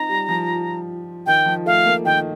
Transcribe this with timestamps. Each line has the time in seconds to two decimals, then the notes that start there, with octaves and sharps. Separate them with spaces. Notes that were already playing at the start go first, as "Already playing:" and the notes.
Already playing: C4 D#4 A#5
0.09 G3
0.29 F3
1.26 D#3 G5
1.46 F3
1.66 A3 F5
1.86 A#3
2.05 D#3 G5